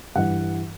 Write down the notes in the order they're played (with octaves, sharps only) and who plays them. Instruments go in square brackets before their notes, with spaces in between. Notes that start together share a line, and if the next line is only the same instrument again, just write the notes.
[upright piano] G2 E3 F#5